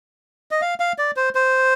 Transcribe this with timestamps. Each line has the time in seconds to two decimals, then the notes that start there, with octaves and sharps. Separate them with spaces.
0.51 D#5
0.62 F5
0.80 F5
0.98 D5
1.16 C5
1.35 C5